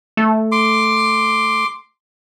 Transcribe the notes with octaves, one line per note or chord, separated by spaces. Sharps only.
A3
C6 D6